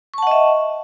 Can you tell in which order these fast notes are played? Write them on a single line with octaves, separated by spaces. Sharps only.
C#6 A5 F#5 D#5 E5